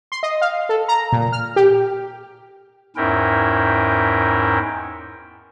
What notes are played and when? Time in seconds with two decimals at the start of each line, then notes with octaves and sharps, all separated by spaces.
0.12 C6
0.23 D#5
0.41 F5
0.69 A4
0.88 A#5
1.12 A#2
1.32 F6
1.56 G4
2.96 E2 G#2 C#4 E4 A#4 G5